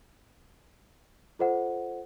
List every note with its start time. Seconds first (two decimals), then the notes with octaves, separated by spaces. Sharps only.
1.39 F4 A4 C5 D#5 F#5